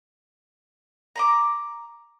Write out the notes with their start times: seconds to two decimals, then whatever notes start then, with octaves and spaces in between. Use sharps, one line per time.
1.16 A#5 B5 D6